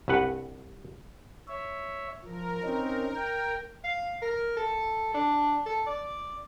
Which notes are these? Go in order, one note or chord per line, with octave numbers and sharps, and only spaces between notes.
C2 G2 B4 F#5
C#5 E5
F3 A#4
C4 C#4 D#4
G5
F5
A#4
A4
D4
A4
D5